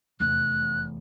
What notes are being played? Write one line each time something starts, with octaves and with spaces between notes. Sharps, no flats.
F1 E2 F#6